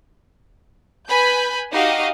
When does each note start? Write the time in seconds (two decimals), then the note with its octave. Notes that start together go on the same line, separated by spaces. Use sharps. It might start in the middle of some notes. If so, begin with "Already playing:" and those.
1.08 B4 G#5 B5 G6
1.72 D#4 F#4 G4 D#5 F5